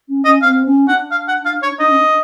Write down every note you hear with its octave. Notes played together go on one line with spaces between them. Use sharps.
C#4
C#4 D#5
C4 F5
C#4
D4 F#5
F5
F#5
F5
C#5
D4 D#5
C#4
D4